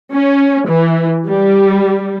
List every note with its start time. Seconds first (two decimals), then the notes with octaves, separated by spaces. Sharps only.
0.13 C#4
0.67 E3
1.28 G3